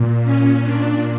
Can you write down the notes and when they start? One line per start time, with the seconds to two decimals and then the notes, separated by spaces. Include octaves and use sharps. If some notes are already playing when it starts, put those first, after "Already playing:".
Already playing: A#2
0.23 C#4
0.60 A#2 D4